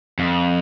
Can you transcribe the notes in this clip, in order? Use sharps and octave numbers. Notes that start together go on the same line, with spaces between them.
F2